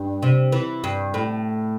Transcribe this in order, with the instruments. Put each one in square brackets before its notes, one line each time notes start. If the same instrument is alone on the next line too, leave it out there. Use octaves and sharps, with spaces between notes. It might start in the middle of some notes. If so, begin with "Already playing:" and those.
Already playing: [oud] G2
C3
E3
G2
A2